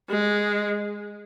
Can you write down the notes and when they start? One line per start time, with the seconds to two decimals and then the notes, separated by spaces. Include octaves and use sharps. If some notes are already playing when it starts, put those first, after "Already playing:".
0.09 G#3